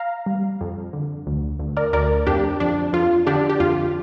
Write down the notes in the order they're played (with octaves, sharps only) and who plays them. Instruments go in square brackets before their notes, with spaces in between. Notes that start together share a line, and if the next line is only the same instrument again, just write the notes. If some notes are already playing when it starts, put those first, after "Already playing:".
Already playing: [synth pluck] F5 A#5
G3
F2
D3
D2
D2
A#4 D5
D2 A#4 D5
F2 D4 G4
F2 D4
F2 F4
D3 D4 G4
G4
F2 F4